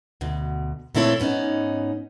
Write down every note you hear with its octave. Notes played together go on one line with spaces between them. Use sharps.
D2 B2
A#2 A3 C4 E4 A4 C#5
G#2 B3 C#4 D#4